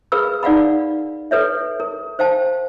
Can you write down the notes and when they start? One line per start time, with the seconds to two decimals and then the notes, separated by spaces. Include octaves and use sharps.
0.12 G#4 A#4 B4 F5 B5 E6
0.43 D#4 D5 F5 F#5 B5
1.31 A4 B4 C#5 E5
1.80 A#4
2.19 C5 F5 G5 A5